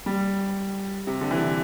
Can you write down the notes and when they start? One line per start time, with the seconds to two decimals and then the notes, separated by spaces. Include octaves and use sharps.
0.06 G3
1.07 C3
1.21 D3
1.31 E3
1.40 D3